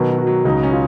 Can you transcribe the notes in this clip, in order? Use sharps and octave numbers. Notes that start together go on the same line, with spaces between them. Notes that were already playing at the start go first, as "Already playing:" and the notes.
Already playing: B2 D#3 F#3
F#3
F#4
F#3
C#2 D#4
C#4
F4